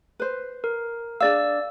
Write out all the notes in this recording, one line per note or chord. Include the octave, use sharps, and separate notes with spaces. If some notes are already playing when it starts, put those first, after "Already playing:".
B4 C5
A#4
D4 G#4 D5 F5 E6